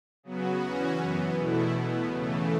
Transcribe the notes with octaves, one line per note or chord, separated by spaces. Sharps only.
C#3 F#3 B3 F#4
E2 E3 C#4 F#4
F#2 E3 B3
E2 B2 A3 E4
E2 B2 B3
C#3 E3 A3